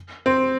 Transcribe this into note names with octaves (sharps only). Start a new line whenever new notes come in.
C4